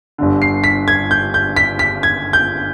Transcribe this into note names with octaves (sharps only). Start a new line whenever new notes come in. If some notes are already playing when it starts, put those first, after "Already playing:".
G1 G2 D3
C7
B6
G#6
G6
G6
B6
B6
G#6
G6